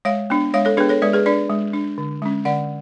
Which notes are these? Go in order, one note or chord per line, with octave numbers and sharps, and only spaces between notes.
G#3 C#5 F5
B3 D4
G#3 C#5 F5
A4 C#5
B3 D4 G#4 B4
A4 C#5
G#3 B4 D5
G#4 B4
D4 B4 D5
G#3
D4
D3
G#3 C#4
D3 D5 F#5